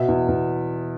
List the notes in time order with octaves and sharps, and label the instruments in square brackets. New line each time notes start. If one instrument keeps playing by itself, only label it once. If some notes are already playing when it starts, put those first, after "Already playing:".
Already playing: [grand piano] B2 E5
E2
E2